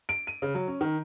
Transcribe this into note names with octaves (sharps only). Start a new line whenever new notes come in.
D7
D#7
C#3
F#3
C#4
D#3